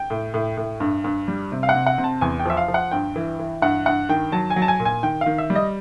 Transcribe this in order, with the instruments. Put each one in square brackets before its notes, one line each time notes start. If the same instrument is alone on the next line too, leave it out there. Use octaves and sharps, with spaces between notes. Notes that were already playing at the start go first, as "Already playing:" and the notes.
Already playing: [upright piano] G5
A2
A2
A2
G2
G2
G3
C3
F5
F#5
C3
F#5
C3
A5
E2 G#5
G5
F3 E5
F5
F3
F#5
G2 G5
E3
E3
G2 F#5
G2 F#5
D#3 G5
F#3 A5
G#5
F#3
A5
G#5
A#2
G#5
D#3 G5
D#3 F5
E5
G3
D#5